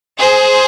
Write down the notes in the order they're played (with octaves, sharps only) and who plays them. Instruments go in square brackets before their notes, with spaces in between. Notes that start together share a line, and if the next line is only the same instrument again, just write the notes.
[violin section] G#4 C5